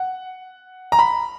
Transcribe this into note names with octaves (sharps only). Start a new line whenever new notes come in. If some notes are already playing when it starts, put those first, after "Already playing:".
Already playing: F#5
A#5
B5